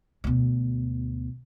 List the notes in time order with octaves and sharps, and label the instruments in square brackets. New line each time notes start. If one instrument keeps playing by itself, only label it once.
[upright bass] D2 B2